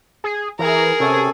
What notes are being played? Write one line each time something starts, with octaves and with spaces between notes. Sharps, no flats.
G#4
E3 G#4 A#4 A#5
C3 C#4 A4 G#5